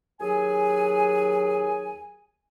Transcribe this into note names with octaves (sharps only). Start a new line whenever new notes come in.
D#2 F#3 G#4 G#5